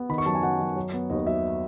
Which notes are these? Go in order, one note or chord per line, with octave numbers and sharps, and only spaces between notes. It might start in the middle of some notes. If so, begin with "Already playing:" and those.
Already playing: B3
D#3 B5
C#6
F#2 A5
G#5
F#2 F#5
F#2
F#3
B3
D#2 D#5
F#3 E5